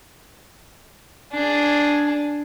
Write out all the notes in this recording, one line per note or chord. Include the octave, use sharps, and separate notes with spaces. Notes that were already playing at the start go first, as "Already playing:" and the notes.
D4 G#4